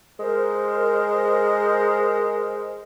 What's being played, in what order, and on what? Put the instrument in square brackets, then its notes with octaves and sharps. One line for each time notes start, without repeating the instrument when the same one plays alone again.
[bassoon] G#3 [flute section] A#4 C5